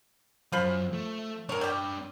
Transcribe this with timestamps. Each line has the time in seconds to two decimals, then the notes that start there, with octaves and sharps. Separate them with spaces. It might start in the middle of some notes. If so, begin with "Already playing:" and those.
0.52 F#2 F4 C5 B5
0.93 A3
1.49 D4 A#4 B4 C#5
1.61 G3 G4